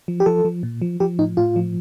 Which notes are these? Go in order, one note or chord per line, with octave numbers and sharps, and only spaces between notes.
F3
G4
F3 A4
F3
A#2
F3
F3 G4
A2 D#4
A2 F4
F3